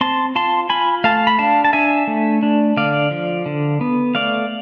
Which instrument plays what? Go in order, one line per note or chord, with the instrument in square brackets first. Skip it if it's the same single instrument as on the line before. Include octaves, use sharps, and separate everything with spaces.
[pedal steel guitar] C4 A5 C6
F4 A5 C6
F4 G#5 B5
A3 F5 A5
B5
D4 F5 A5
A5
D4 E5 G#5
A3
D4
D3 D5 F5
F3
D3
B3
A3 D5 F5